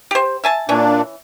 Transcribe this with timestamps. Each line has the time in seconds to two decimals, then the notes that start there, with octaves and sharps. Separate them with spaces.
0.11 G4 C5
0.44 E5 G#5 A5
0.69 A#2 E3 C#4 D4